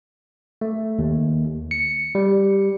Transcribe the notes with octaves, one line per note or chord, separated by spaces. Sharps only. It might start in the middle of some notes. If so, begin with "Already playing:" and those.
A3
D#2
C#7
G3